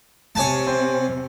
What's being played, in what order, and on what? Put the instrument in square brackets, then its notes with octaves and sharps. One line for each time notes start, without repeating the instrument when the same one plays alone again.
[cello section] C3 [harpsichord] C#5 G#5 A5
[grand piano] C4